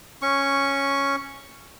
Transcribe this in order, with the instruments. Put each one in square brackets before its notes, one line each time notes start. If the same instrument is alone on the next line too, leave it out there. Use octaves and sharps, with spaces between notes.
[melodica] C#4 C#6